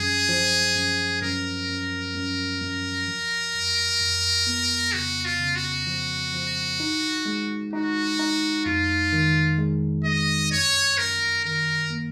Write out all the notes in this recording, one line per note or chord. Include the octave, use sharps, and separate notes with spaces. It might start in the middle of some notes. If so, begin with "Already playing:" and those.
Already playing: F#2 F3 G#4
F3
F#2
F#2 A#4
F#2
F#2
F#2
F3
F2
F2
B3
C#3 F#4
F4
C#3
F#4
F3
F3
D#4
G#3
D#4 F#4
D#4
F2 F4
D#3
G#3
G#3 D#5
F#2 C#5
F#2 A#4
D#3 A#4
A#3